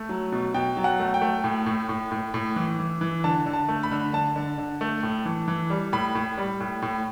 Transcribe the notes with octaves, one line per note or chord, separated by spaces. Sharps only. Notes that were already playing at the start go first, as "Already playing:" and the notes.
Already playing: A3
F#3
B2
B2 G5
F#3
F#5
A3
G5
A3
A2
A2
A2
A2
A2
E3
E3
E3
D3 A5
D3
A5
A3
B5
D3
D3 A5
D3
D3
A3
A2
E3
E3
G3
A2 B5
A2
G3
A2
A2